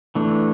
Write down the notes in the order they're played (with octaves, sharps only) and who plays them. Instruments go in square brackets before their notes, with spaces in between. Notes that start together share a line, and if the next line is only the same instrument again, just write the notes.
[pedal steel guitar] E3 A3 D4